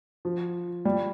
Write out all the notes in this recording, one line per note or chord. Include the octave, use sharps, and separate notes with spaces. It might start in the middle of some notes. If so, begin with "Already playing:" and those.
F3
G3